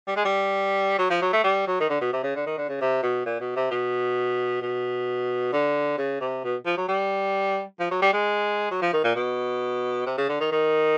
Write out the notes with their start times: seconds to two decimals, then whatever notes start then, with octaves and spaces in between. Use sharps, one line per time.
0.07 G3
0.16 G#3
0.25 G3
0.99 F#3
1.10 F3
1.22 F#3
1.33 A3
1.44 G3
1.67 F#3
1.80 D#3
1.89 D3
2.01 B2
2.13 C3
2.23 C#3
2.35 D3
2.46 D#3
2.58 D3
2.69 C#3
2.81 C3
3.03 B2
3.26 A#2
3.40 B2
3.56 C3
3.71 B2
4.62 B2
5.53 D3
5.98 C#3
6.21 C3
6.44 B2
6.66 F3
6.77 F#3
6.88 G3
7.80 F3
7.91 F#3
8.02 G3
8.13 G#3
8.71 F#3
8.82 F3
8.93 D#3
9.04 A#2
9.15 B2
10.06 C3
10.18 C#3
10.29 D3
10.40 D#3
10.52 D#3